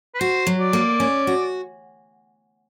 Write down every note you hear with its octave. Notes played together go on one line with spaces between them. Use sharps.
B4
F#4 C5
F#3
D5
A#3
C#4
F#4